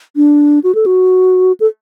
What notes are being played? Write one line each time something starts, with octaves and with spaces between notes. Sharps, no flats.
D4
F#4
A4
F#4
A4